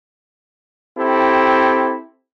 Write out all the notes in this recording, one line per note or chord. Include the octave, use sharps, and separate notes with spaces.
C4 E4 G4 A4